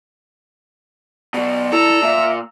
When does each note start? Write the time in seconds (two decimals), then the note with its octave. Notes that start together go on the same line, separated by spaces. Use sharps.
1.34 B2 F#3 D5
1.72 E4 A4 A#5 E6
2.03 A#2 E5